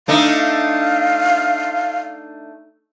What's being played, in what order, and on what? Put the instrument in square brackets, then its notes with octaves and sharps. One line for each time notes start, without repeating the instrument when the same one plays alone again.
[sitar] A3 D4 D#4 [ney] F5